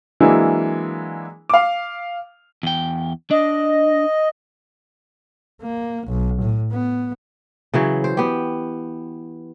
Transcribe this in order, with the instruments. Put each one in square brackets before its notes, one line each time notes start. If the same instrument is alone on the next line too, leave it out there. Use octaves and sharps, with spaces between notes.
[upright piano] E3 F#3 G#3 A#3 D4 E4
F5 D6
[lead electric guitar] E2 G5
[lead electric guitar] D4 [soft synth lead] D#5
[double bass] A#3
B1
A2
B3
[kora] C#3 E3 F#3
C5
B3 G4